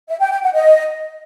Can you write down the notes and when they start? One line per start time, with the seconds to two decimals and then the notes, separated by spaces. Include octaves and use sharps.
0.08 E5
0.20 G5
0.31 G5
0.42 F#5
0.54 D#5